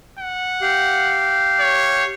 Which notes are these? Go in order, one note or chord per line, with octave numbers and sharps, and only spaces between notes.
F#5
G4 F5
C#5